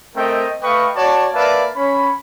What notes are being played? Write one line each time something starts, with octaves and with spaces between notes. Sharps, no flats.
A3 C4 A#4 D#5 G5
A3 B4 D#5 F5 G5 C#6
F#4 C#5 D5 A5
A#3 B4 D5 E5 F5 A5
C#4 C#5 B5